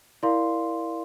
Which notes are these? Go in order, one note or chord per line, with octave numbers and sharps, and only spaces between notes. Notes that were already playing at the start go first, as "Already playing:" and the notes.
E4 A#4 D5 F5 C6